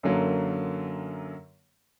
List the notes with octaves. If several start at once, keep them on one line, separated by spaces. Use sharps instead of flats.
F#2 D3 F#3 A#3